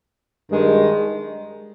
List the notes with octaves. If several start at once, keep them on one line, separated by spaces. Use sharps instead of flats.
G2 D#3 G#3